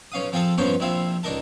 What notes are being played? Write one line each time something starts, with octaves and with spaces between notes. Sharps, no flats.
B1 C#4 F5 D#6
F3 C4 F4 G#4 A4
G2 F3 A#3 B3 C#4 C5
A#1 C3 C4 E4 F5
C#2 D4 D#4 A#4 A5